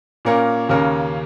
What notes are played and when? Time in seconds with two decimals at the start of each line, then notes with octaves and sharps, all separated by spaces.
0.25 A#2 A#3 C#4 A#4
0.69 D#2 C#3 A#3 C#4 A#4